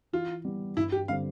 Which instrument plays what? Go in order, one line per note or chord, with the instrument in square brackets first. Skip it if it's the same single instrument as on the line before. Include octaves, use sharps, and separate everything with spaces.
[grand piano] E3 [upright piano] F4
[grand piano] G3 B3
[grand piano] G2 [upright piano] E4
[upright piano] G4
[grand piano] D3 G3 C4 [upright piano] F5